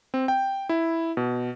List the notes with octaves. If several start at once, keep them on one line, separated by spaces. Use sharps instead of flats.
C4
G5
E4
B2